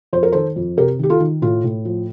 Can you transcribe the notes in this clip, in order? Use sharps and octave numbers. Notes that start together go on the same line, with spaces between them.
F2 C5
A#4
D#3 A4 C5
F2
C3 G4 A#4
D#3 G4
F4 A4
D#3
A2 F4
A2
F3